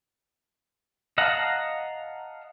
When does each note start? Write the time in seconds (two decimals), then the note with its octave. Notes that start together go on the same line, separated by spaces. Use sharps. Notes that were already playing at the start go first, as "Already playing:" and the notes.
1.18 D#5 F5 F#5 A5 A#5